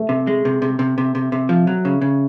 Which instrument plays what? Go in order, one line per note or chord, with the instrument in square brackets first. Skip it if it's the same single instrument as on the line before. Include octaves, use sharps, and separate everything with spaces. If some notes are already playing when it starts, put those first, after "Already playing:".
Already playing: [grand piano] A3
[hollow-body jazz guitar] C3
G#3
C3
C3
C3
C3
C3
C3
F3
F#3
C#3
C#3